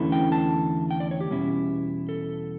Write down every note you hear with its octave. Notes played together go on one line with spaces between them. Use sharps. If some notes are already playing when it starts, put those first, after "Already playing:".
Already playing: E2 D3 A3 C#4 E4
G5
A5
G5
D5
C#5
G4
E2 B2 G3 C#4 E4
A4